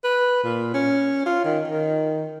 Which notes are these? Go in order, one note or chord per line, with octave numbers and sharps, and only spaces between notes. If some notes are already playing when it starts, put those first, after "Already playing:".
B4
A#2
C#4
F4
D#3
D#3